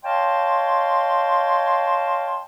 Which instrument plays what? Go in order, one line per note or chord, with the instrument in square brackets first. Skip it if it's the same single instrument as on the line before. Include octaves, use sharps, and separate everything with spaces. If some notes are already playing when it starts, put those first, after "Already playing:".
[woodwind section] C#5 D#5 F5 G5 A5 C6